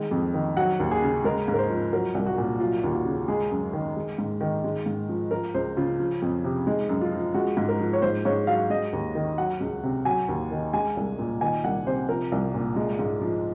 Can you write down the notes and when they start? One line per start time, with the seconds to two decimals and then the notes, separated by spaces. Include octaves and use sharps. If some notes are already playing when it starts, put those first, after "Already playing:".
Already playing: D#3 G#3
0.11 F2
0.34 D#3
0.57 F#3 F#5
0.80 D#2
0.91 G#4
1.02 C#3
1.24 G#3 A#4
1.48 G#2
1.54 A#4
1.58 C5
1.70 F3
1.93 F#3 A#4
2.15 C2
2.26 F#4
2.38 A#2
2.60 F#3 F4
2.84 D#2
2.94 F#4
3.05 C#3
3.28 G#3 G#4
3.51 F#2
3.73 D#3
3.96 G#3
4.18 G#2
4.41 D#3
4.64 G#3
4.86 G#2
5.09 F3
5.31 F3 A#4
5.54 C#2 C5
5.77 C#3 F4
6.00 F3
6.22 F2
6.45 C3
6.67 G#3 D#4
6.89 F#2
7.01 F4
7.12 F3
7.34 G#3 F#4
7.57 G#2
7.68 A#4
7.80 F3
7.93 C#5
8.02 G#2 C5
8.25 G#2 C#5
8.47 F#3 F5
8.70 G#3 D#5
8.93 D#2
9.15 D#3
9.38 F#3 F#5
9.60 C#2
9.83 C3
10.05 F#3 G#5
10.28 D#2
10.51 D#3
10.73 G#3 G#5
10.97 C2
11.19 A#2
11.41 D#3 G#5
11.64 C2 F#5
11.86 C3 C5
12.09 F3 A#4
12.32 C2
12.54 A#2
12.76 G#3
12.99 G#2
13.21 F3